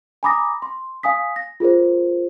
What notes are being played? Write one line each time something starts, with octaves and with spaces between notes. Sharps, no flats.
G#5 A#5 B5 D6 D#6 A#6
C6
F5 G#5 D#6 B6
A#6
F4 G#4 A#4 C5